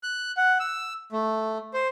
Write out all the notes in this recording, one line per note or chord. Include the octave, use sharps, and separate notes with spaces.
F#6
F#5
E6
A3
C5